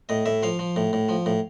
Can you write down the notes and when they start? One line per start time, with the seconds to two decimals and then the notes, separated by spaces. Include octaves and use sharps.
0.09 A2 D#5
0.26 A2 E5
0.43 F3 F5
0.59 F3
0.76 A2
0.93 A2
1.09 F3
1.26 A2